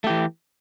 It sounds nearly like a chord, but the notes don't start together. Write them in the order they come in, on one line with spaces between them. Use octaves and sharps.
A3 G4 E3